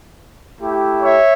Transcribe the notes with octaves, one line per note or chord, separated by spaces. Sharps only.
A3 E4 G4
C#5 E5